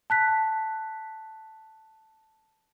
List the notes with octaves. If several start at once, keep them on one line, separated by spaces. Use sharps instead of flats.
A5 F#6 B6